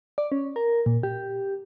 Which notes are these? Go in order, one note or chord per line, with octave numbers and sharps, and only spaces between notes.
D5
C#4
A#4
A#2
G4